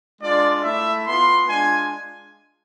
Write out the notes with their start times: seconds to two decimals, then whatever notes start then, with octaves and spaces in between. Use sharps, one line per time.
0.21 G#3 D4 F4 D5
0.63 A3 E4 E5
1.06 B3 F4 C6
1.47 G#3 D4 F4 G#5